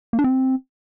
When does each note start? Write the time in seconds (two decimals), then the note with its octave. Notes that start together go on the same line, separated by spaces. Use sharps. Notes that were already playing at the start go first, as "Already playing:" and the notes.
0.13 A#3
0.19 D4
0.24 C4